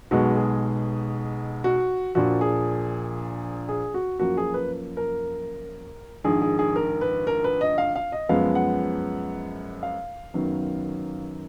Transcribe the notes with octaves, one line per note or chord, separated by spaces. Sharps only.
B1 B2 G#3 B3 F#4
G#4
F#4
A#1 A#2 F3 F#4
G#4
G#4
F#4
F#2 F3 A#3 F#4
G#4
B4
A#4
A#1 G#2 D#3 G#4
G#4
G#4
A#4
B4
A#4
B4
D#5
F5
F5
D#5
F#2 F3 G#3 B3 F5
F#5
F5
F#2 D#3 F#3 B3